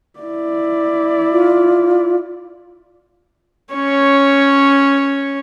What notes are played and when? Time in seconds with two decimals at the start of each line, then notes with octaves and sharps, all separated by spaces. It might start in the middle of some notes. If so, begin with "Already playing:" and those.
0.20 E4 D5
1.32 F4
3.74 C#4 C#5